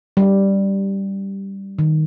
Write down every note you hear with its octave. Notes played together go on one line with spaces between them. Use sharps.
G3
D#3